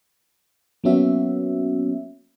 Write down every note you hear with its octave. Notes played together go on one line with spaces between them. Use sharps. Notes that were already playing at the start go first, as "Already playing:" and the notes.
F#3 A#3 B3 C#4 F#4 E5